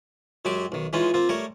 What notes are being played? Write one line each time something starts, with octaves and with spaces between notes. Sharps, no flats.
F#2 F#3 G#3 G4 D6
B1 D#3
E3 G#3 C#4 D#4 F4
A#3 C4 F4
G3 A3 A#4 C#5